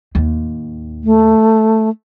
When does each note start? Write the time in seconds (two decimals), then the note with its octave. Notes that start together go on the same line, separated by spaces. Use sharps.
0.15 D#2 A2
1.04 A3